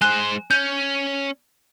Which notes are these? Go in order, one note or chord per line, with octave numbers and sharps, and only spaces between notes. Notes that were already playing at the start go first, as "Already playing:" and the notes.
G#3 C5 G#5 F#6 G7
C#4 G6